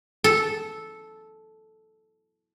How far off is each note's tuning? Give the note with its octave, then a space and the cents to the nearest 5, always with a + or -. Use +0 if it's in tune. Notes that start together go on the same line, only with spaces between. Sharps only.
A4 -10